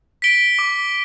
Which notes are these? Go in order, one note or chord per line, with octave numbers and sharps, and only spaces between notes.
B6 D7 G7
D6